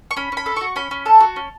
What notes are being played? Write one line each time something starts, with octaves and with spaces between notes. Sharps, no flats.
C#6
C#4 B5
C#4 B5
A4
F#4 C#6
C#4 B5
C#4
A4 A5
F#4
C#4